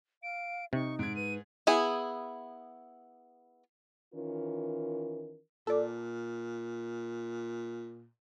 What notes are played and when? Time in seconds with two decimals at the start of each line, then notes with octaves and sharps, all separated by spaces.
0.23 F5 D7
0.73 C3 D#4 C#6
0.99 G#2 G#6 D7
1.16 B4 D#7
1.67 B3 E4 G#4
4.14 D#3 E3 C#4 F4 A#4
5.67 A#2 A4 D5